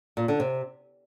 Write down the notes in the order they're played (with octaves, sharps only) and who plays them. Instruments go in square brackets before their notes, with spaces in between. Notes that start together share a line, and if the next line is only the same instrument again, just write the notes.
[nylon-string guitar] A#2
D3
C3